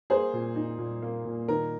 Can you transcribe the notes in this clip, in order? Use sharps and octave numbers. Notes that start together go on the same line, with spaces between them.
A#3 G#4 C5
A#2
D#4
A#2
A#3
A#2
D#3 A#4